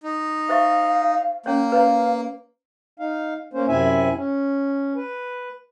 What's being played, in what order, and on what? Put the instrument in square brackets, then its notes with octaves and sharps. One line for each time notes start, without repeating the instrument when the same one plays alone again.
[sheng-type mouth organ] D#4
[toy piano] C5 E5 C#6 [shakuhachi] F5
[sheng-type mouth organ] A#3 [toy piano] C#4 C#5
[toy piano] B4 C#5 A#5 [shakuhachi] F5
[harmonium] D#4 F5
A#3 C#4 C5
F#2 C3 C4 E4 E5 G#5
C#4
B4